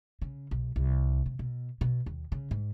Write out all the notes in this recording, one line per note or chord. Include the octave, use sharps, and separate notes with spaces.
C#3
B1
C2
C3
B2
B2
D#2
C#3
G#2